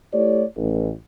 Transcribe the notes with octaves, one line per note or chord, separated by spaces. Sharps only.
A3 E4 G4 C#5 D5
A1